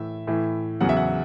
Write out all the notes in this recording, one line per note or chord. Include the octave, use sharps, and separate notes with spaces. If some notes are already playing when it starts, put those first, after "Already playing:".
Already playing: A2 E3 E5
A2 E3
E2 C#3 F#3 F#5
E5
F#5